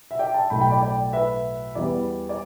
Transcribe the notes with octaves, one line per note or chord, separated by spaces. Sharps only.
E5
D5 G5
E5 A5
B1 A2 A3 G5 B5
G5 B5
D5
D5 G5
B4 E5
E2 E3 G3 B3 D5
D5